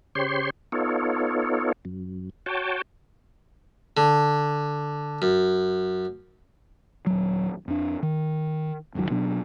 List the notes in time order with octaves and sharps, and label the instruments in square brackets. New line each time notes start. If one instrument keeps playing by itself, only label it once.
[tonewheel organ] C#3 G4 C5 C#5 C6
B3 D#4 F4 A4 C#5
F#2
F#4 C#5 G5 A5
[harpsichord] D3
F#2
[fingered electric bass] D#1 F#3
F2 D4
D#3
F#1 C#2 D#3 F#3
B2 F#3 B3 D4